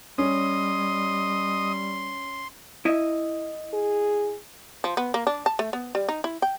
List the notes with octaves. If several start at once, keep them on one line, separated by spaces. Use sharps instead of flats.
G3 C#4 D#5 C6 D#6
E4 D#5 E5
G#4
F3
B3
A#3
D4
A5
A3
B3
G3
D#4
E4
G5